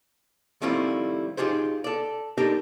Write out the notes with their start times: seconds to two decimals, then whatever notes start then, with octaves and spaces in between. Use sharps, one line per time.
0.62 D#3 G3 A3 C4 E4 F4
1.37 D#4 F4 G4 G#4 C5
1.84 A4 D5
2.38 D4 D#4 G4 A4 A#4